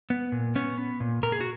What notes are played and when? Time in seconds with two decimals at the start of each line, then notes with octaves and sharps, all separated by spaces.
0.10 B3
0.32 A#2
0.55 B3 C#4
0.77 B3
1.00 A#2
1.23 A#2 A#4
1.32 G#4
1.41 F#4